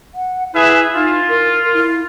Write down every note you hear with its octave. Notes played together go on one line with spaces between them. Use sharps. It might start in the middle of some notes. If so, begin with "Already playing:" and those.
F#5
E4 G#4 B4 E5
D#4 F4
A#4
E4